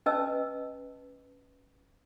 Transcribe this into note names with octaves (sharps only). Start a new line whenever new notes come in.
C#4 B4 D#5 A5 E6